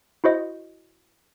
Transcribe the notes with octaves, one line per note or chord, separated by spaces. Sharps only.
E4 F#4 C5 D#5